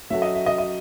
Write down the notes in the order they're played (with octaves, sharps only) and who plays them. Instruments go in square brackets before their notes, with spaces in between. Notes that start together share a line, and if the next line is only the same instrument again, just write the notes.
[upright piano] F#3 C#4 F#4 A4 [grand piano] E5
[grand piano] D#5
E5
D#5
D#5